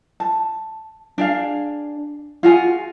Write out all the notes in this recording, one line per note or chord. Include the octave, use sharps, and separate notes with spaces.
A5
D4 G#4 F5
F4 F#4 G#4 G#5